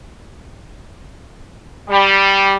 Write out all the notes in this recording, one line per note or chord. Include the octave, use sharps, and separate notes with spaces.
G3